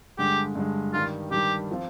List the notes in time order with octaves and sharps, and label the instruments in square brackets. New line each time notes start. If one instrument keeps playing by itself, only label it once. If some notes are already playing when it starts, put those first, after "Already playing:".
[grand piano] G2 D3 G#3 [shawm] G4
[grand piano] G2 D3 G#3
[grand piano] G2 D#3 G3 [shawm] F4
[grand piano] G2 D#3 G3 [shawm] G4
[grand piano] F3 C4 F4